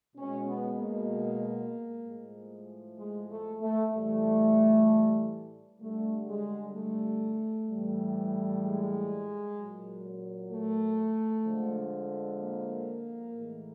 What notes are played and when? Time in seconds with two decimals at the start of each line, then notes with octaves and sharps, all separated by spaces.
0.16 B2 G#3 C#4
0.47 B3
0.79 A#3
2.05 A2 F3 G#3
2.98 G#3
3.30 A3
3.61 A3
3.93 A2 E3 G3 A3
5.81 D3 G3 A3
6.28 G#3
6.75 A3
7.68 A2 E3 G3
8.63 G#3
9.57 A#2 F#3
10.51 A3
11.45 D3 F3 G#3
12.40 A#3
13.33 A2 E3 G#3